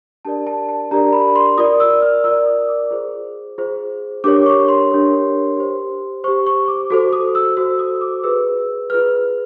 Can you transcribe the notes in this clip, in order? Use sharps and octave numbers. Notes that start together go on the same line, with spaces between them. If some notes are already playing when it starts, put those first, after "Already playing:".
D4 G4 A#4 D5 A5
A5
A5
D4 G4 A#4 D5 A#5
B5
C6
F4 A#4 D5 D#6
E6
F6
F4 A#4 D5 E6
D#6
D6
F4 G#4 C5
F4 G#4 C5
D4 G4 A#4 C#5 D6
C#6
C6
D4 G4 A#4 C#5
G4 C5
G4 C5 C#6
C#6
D6
F#4 A4 C5 D6
D#6
E6
F#4 A4 C5 E6
D#6
D6
F4 G#4 B4 E6
F4 G#4 B4 F6